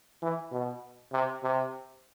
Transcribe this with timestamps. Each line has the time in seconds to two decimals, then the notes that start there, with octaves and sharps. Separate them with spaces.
0.22 E3
0.52 B2
1.12 C3
1.43 C3